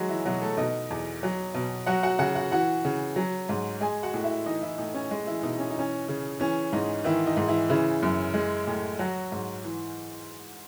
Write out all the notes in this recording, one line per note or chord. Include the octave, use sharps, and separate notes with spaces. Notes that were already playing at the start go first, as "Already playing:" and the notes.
Already playing: D#3 F#3 G#3 F#4
E3 E4
B2 F#3 F#4
A3 A4
B2 D#4 D#5
E2
F#3
B2
F#3 F#4 F#5
F#4 F#5
C#3 F#4 F#5
F#4 F#5
E3 F#4 F#5
C#3
F#3
G#2
G#3 G#4 G#5
F#4 F#5
A2
E4 E5
E3 D#4 D#5
E3 E4
A2 D#4
C#4
G#3
E3 E4
B2 D#4
C#4
D#4
E3 C#4
C#3
E3 C#4
G#2 D#4
D#3 E3 E4
D#4
G#2
E3 E4
C#3 E3 E4
F#2
G#3
A2
F#3 F#4
G#2
E3